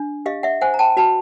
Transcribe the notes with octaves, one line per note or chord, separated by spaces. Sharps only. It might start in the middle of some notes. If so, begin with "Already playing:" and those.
Already playing: D4
G4 D#5 F5
E5 F#5
C5 F#5 G#5
A#5
G5 A5
F#4 A5 B5